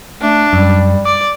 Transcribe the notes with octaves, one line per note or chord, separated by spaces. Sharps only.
A3 D4
F#2 G3
D5 D6